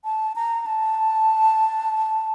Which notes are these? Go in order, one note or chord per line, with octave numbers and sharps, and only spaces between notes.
A5
A#5
A5